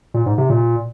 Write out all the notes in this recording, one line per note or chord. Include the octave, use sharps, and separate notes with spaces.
A#2
G#2
C3
A#2